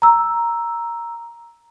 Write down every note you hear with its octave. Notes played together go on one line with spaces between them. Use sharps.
A#5 E6